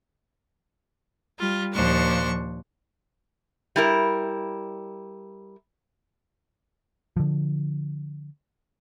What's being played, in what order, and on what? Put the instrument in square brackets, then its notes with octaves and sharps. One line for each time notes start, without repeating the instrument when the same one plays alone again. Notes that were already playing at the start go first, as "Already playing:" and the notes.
[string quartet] G3 F4
D#2 A#2 F3 D4 C5 C#6
[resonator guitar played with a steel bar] G3 E4 A#4
[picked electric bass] D3 F3